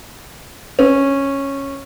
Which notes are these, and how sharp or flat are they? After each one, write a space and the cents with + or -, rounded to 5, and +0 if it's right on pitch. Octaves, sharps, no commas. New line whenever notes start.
C#4 -10